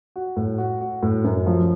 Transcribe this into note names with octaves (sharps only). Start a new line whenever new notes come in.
F#4
A2
F#4
F#4
A2
F#2
F3